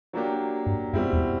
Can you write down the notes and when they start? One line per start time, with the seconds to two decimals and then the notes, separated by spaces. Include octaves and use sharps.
0.13 F#3 A#3 D4 G4
0.66 G2
0.93 F#2 B2 G3 C4 E4
1.13 E2